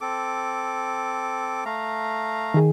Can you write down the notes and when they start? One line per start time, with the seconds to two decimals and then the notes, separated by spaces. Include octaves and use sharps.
0.01 C4 A4 D6
1.66 A3 F5 A#5
2.54 D#3 G#4